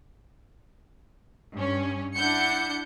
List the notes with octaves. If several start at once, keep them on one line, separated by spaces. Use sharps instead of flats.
G2 C#4
D4 E4 F#5 G6 C#7